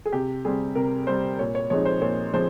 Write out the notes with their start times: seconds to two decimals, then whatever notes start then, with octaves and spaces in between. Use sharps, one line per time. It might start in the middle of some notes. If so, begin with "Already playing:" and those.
0.06 G#4
0.13 C3 G4
0.45 G3 C4 G#4
0.75 C3 A#4
1.07 G3 C4 C5
1.39 A#2 C#5
1.55 C#5
1.70 F3 G#3 C4 D#4 C#5
1.85 C5
2.01 A#2 C#5
2.34 F3 G#3 C4 C5